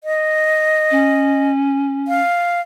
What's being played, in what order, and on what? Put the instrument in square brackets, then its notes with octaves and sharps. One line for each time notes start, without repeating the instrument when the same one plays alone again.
[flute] D#5
[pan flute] C#4
[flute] F5